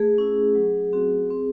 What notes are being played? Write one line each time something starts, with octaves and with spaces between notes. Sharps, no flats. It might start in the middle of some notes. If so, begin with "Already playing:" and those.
Already playing: A3 G#4
C#4 E4
F#3
C4 F#4
C4